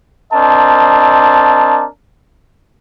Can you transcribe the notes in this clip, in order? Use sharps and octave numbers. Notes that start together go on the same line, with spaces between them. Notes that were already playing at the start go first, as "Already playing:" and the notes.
C4 D4 A#4 D#5 A5